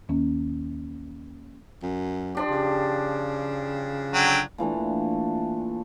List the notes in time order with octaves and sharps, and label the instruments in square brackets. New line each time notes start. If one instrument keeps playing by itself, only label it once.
[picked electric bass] D#1 D#2 [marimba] A#3 C#4
[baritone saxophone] F#2
[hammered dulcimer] F3 D4 G4
[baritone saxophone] C#3
[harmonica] D3 F#3 G5
[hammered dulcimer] A#2 E3 A3 D4